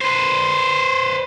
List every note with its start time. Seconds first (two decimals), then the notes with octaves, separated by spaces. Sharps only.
0.01 B4 C5